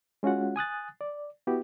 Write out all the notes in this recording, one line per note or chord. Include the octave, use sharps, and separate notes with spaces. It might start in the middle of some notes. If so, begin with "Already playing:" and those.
G#3 C#4 F4 F#4 F#5
G#5 D#6 F#6 A6
D5
B3 E4 F#4 G4